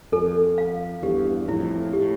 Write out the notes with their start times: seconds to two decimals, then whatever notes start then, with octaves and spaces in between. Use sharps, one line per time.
0.12 F2 A4
0.58 F5
1.02 E2 G2 G4
1.48 F2 A2 E4
1.93 A2 G4